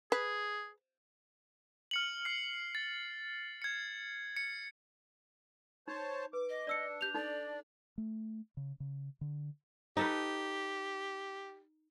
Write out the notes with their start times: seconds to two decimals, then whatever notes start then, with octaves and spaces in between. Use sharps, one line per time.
0.12 G#4 B4
1.91 F6 C#7 F#7
2.25 F6 C7
2.75 A6
3.62 G#6 C#7
4.37 C#7
5.88 D#4 C5 C#5 A5
6.33 B4 D6
6.49 D#5
6.67 D4 D5 E6 C#7
7.01 G4 G6 F7
7.14 D#4 A4 D5 A5
7.98 A3
8.57 C#3
8.80 C#3
9.21 D3
9.97 D#4 G4 A4 B4